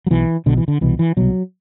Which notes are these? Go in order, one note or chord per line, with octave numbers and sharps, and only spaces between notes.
F#3
B1 B2 E3
B1 B2 D3
E3
D3
C2 B2 E3
E3
C2 B2 F#3